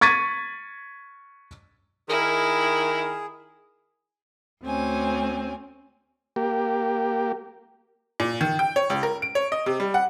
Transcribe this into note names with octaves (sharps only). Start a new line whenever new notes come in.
C#6 G#6 A6 B6 D#7
D#3 E4 G#4 A#4
D2 C4 C#4 G#5
A#3 G4
A#2
D#3
G5
C#5
C#2
A#4
D7
C#5
D#5
C3
G3
F#5